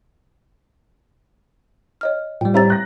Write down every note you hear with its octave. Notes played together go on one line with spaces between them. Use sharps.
C#5 D#5 F6
A2 F3 G3 G5
C4 E4 G4 C#5 A#5 A6
F#6 A#6